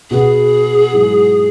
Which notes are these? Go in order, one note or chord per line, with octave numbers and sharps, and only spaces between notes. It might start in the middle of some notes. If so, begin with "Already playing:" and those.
B2 B3 F#4 G#4
G#2 F#3 E4